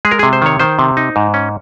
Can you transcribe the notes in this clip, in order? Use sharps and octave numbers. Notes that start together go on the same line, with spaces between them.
G#3 G#4
A#4
C3 G#4
C5
D#3 C#5
D#3 C5
C3
D#4
G#2
C#4